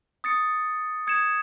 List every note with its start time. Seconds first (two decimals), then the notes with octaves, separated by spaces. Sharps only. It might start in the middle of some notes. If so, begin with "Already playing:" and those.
0.24 D#6 A6 C#7
1.07 D#6 G#6 C#7 E7